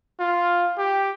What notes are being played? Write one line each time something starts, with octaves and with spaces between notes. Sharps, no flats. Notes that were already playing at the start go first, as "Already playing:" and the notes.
F4
G4